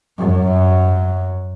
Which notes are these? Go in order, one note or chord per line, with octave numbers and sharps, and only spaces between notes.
F#2 F#3